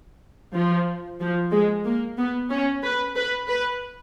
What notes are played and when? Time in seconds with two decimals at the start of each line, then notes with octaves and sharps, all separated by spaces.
0.54 F3
1.20 F3
1.52 G#3
1.85 A#3
2.18 B3
2.50 C#4
2.83 B4
3.15 B4
3.48 B4